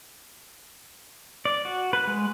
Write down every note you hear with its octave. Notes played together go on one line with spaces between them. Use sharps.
D5
F#4
B4
G#3